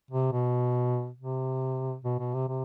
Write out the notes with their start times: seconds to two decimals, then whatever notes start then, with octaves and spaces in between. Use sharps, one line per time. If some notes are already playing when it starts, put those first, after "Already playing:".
0.11 C3
0.33 B2
1.19 C3
2.05 B2
2.19 B2
2.34 C3
2.48 C3